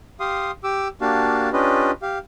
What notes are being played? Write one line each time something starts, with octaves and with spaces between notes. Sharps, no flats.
G4 F5 C6 D#6
G4 D6 E6
A#3 D4 F#4 G4 F5 A5
C#4 D4 F4 G4 B4 D#5
G4 F5